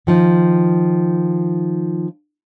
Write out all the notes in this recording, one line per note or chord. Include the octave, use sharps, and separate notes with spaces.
D#3 F3 D#4